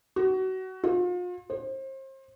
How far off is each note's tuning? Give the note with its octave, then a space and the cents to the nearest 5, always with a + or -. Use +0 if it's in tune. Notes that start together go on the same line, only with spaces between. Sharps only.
F#4 +25
F4 +40
C5 +35